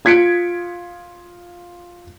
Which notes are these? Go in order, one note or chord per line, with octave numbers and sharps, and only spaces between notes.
F4 G#6 B6 C#7 D7